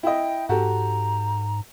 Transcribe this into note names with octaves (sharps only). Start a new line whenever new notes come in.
E4 D#5 G5
G#2 F#4 G4 A4 A#5